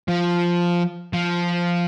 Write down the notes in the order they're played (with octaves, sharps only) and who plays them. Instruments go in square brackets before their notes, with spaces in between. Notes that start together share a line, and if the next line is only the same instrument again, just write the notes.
[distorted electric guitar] F3
F3